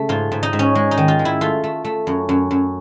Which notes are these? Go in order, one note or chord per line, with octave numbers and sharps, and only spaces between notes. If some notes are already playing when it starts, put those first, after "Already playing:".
Already playing: C#3 A3
G#2 F4
G#2
D#4
G#2
C#4
G#3
D#4
D#3
F4
G#3
E4
A3 F4
A3
A3
F#2
F#2
F#2